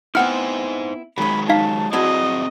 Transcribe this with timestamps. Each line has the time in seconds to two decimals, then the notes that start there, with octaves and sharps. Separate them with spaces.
0.15 B3 C4 D#4 E4 C5 F#5 G#5 F6
1.18 D#3 F#3 G#3 C#4 B5
1.49 D#4 F5 A5 B6
1.93 F#3 C4 E4 G#4 D5 D#5 A5